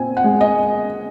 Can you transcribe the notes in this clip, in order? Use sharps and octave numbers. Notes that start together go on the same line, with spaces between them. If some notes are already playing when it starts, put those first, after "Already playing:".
Already playing: A#2 C4 G#5
F#5
G#3
D#5